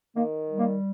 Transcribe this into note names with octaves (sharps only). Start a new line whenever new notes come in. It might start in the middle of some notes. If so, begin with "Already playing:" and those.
D#3 A#3
G3
A#3